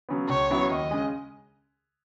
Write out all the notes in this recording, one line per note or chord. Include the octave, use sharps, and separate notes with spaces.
C#3 F#3 B3
C#2 C#5
C#3 F#3 B3 E4
D#2 D#5
C#3 G#3